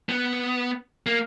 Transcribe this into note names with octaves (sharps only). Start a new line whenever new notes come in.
B3
A#3